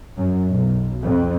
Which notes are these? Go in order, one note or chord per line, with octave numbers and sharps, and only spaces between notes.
F#2
B1
F2